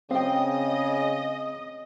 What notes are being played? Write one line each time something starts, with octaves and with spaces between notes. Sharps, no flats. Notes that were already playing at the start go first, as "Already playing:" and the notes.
C#3 C4 D#5 F5 G5